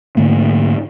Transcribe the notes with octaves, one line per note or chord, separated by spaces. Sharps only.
G#2 D3 A3 A#3